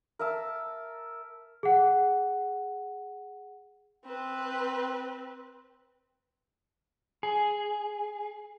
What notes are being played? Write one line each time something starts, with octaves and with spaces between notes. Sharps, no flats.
A#4 E5 A5 E6
G#4 F#5
C4 B4
G#4